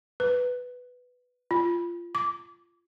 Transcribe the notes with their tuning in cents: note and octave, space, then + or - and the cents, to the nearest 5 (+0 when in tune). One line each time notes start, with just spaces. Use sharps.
B4 +5
F4 -15
D6 -15